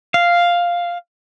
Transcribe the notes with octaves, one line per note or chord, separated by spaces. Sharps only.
F5